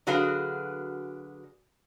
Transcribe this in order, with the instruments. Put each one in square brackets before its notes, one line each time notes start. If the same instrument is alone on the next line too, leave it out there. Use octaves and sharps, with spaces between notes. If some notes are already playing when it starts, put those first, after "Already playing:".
[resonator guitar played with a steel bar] D3 F#3 F#4 G#4 B4 F5